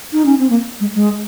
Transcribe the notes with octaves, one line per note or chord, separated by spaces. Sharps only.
D#4
C#4
C4
A#3
G#3
G#3